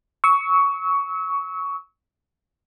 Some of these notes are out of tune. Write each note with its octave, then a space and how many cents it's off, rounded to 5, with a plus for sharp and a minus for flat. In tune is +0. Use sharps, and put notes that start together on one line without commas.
C#6 +15 E6 -35